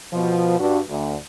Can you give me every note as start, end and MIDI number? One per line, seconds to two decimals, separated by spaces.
0.13 0.58 47
0.13 0.58 53
0.60 0.80 43
0.60 0.80 62
0.60 0.80 66
0.89 1.15 38